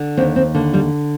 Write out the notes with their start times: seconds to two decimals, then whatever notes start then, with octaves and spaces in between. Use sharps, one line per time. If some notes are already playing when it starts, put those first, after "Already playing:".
Already playing: D3
0.17 D#2 C4
0.36 C4
0.55 D3 A#3
0.73 G3